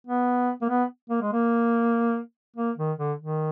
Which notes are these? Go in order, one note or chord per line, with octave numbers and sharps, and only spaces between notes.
B3
A#3
B3
A#3
G#3
A#3
A#3
D#3
D3
D#3